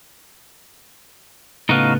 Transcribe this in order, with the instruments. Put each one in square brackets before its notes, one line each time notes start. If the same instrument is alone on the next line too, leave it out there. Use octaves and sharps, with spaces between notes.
[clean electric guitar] A2 C#3 B3 [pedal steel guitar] D#4 F#4 F5